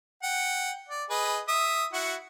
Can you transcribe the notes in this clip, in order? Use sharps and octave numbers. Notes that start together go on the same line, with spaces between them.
F#5 G5
D5
G#4 B4 D#5
E5 D#6
E4 F#4 F#5